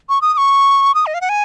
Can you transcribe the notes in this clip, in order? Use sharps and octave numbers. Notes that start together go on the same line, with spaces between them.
C#6
D#6
D#6
C#6
D#6
D#5
F5
F#5
G#5